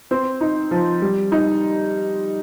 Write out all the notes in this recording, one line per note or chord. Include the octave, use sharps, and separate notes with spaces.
C4
D#4
F3
G3
D#4